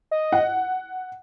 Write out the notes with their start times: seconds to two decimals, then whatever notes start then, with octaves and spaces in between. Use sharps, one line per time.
0.11 D#5
0.32 F#5